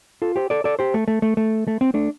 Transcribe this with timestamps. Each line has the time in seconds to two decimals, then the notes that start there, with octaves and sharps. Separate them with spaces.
0.22 F4 A4
0.36 G4 C5
0.50 A4 D5
0.64 A4 D5
0.79 G4 C5
0.94 A3
1.08 A3
1.22 A3
1.37 A3
1.68 A3
1.81 C4
1.94 A3 D4